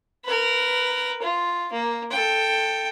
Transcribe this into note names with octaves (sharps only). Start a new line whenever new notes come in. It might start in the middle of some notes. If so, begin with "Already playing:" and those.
A#4 B4
F4
A#3
A4 G5